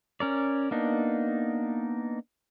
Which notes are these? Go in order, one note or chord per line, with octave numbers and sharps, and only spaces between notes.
C#4 A#4 D5
A#3 B3 D4 D#4